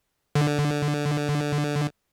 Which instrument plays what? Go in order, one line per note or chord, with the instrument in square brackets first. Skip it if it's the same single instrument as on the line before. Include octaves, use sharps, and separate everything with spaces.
[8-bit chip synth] D3